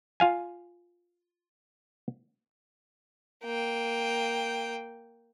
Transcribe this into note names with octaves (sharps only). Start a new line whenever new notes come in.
F4 F5 G#5
A#3 G5